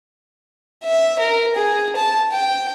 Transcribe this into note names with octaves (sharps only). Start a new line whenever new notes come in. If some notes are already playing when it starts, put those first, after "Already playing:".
E5
A#4
G#4
A5
G5